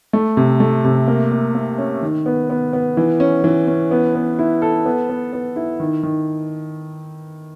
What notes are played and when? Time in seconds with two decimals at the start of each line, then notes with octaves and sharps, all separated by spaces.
0.13 A3
0.37 C3
0.60 A3
0.85 C3
1.08 A#3
1.32 A#3
1.55 A#3
1.78 C#4
2.02 D#3
2.26 B3
2.50 B3
2.73 B3
2.97 E3
3.20 C#4
3.44 E3
3.67 C#4
3.91 B3
4.15 B3
4.39 E4
4.62 A4
4.86 B3
5.09 B3
5.33 B3
5.56 E4
5.80 D#3
6.03 D#3